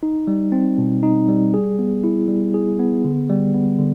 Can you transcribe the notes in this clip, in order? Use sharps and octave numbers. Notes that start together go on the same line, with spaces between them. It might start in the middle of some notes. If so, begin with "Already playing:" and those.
D#4
G3
C4
B2
D#4
G3
G#4
B3
E4
G3
G#4
B3
D3
G3
B3
D3